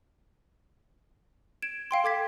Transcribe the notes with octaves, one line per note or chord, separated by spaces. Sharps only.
G#6 D7 E7
F5 G5 C6
A4 D6 G#6 B6